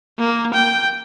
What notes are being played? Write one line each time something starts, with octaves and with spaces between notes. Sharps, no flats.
A#3
G5